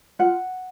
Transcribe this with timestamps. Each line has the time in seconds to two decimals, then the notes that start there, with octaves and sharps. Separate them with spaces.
0.19 F4 F#5